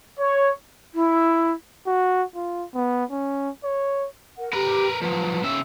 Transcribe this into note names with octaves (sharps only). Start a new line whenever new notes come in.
C#5
E4
F#4
F4
B3
C#4
C#5
A#4 F#5
G4 A#4 B4
F3 F#3 B4
C#3 E5